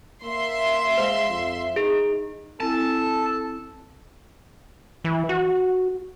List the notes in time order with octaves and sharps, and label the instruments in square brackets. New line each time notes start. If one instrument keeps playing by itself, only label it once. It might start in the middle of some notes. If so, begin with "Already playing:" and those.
[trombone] A#3 [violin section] E5 C6
[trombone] G#3 [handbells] C5 F5
[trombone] F2
[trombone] D#4 [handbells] G#4
[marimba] C4 E4 G#5 [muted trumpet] A4 [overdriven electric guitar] A5
[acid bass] E3
F#4